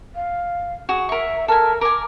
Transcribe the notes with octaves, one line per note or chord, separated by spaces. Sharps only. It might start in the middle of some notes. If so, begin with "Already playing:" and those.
F5
F#4 G#4
A#4 E5 C#6
A4 A#4 G#5
A#4 G#5 D6